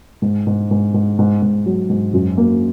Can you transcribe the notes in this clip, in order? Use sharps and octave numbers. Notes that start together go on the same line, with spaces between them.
G#2
G#2
G#2
G#2
G#2
G#2
F#3
G#2
F#2
A#3